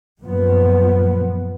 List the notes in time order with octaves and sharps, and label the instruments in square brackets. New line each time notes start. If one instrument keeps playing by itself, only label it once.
[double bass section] F#2 A#2 F3 B3